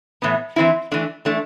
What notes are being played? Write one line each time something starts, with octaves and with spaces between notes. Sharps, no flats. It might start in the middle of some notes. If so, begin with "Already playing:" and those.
A2 E3 B3
E3 G3 C4 E4
E3 A3 D4
E3 A3 D4